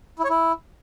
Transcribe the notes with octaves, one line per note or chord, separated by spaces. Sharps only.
E4
C#5
E4